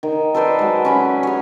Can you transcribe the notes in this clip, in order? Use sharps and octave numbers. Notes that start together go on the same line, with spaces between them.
D#3
A4 B4 C5 D5
F#3 G#3
C#4 G#5 B5
G#4 C#5